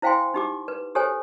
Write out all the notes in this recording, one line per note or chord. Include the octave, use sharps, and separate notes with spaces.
E4 C5 F5 G5 G#5 C6
D#4 G4 D6
B4
G4 A4 C5 C#5 G#5